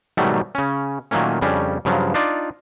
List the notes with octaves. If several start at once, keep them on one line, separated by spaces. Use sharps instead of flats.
G#2 B2 D#3 F#3 G3 A3
C#3 C#4
A#2 D#3 F#3 A3 A#3 C#4
F2 C#3 G3 C#4 D4
G2 C#3 F3 F#3
D4 D#4 F4 D5